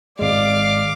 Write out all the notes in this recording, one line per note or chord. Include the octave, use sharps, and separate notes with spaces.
G#1 G#3 D5 F5 D6